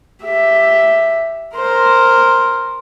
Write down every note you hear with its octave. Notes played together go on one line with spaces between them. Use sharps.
G4 E5
A#4 C5